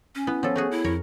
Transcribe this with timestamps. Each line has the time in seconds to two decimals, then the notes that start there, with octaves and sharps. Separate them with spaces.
0.15 C#4
0.27 B3 E4
0.43 F3 B3 A4 C#5
0.56 A3 F#4 G#4
0.71 E4
0.84 F2 A#4 C#5